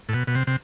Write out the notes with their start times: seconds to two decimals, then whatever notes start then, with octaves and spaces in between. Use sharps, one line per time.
0.09 A2
0.13 B2
0.27 B2
0.35 C3
0.47 C3